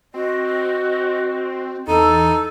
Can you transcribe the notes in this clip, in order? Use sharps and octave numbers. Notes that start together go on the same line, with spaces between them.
C4 F#4 D#5
E2 D#4 A4